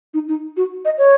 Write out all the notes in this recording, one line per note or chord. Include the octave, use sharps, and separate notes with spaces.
D#4
D#4
F#4
D#5
C#5